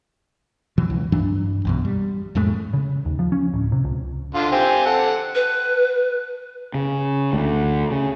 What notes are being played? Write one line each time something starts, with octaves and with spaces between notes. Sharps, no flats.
B2 E3 F#3
C#2
G2 E3 F#3 D4
B1 F#2 B2
G3
F2 A2 G#3 A3
C#3
D#2
F3
C#4
D1
C3
C#2
D3 F4
C4 G4 G#5
A4 F#5
B4
C#3
D2
C#3